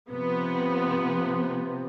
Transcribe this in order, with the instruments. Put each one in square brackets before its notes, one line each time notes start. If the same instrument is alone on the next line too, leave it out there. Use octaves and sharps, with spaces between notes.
[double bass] C3 F3 [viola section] B3